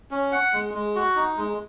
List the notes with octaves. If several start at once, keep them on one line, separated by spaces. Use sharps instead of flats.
C#4
F#5
G#3
G#3
F#4
D#4
G#3